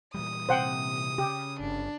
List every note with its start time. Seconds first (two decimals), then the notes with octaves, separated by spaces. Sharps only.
0.14 A#2 E3 G3 D#6
0.49 C3 C5 F#5 G5
1.18 C#3 G4
1.60 G1 D4